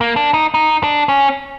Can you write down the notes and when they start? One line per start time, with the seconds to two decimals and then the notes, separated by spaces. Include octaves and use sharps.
0.01 A#3
0.16 D4
0.34 D#4
0.54 D#4
0.84 D4
1.09 C#4